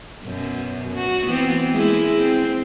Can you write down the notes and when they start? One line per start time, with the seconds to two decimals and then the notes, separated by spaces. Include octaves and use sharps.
0.23 F#2 B2
0.94 F#4
1.25 E3 B3 C4
1.72 G#3 A#3 E4
2.17 C4